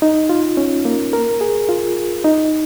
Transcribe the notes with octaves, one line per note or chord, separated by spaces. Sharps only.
D#4
F4
C#4
A#3
A#4
G#4
F4
D#4